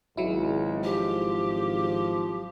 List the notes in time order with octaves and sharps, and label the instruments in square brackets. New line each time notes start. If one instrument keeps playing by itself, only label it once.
[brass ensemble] G#1 [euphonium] C#2 [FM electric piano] F#3 E4
[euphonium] F3 [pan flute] G4